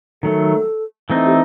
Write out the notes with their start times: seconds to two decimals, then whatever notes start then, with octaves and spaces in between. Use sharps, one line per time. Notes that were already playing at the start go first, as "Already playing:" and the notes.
0.23 D#3 F#3 A3 A4
1.10 E3 A3 C4 D#4
1.26 G4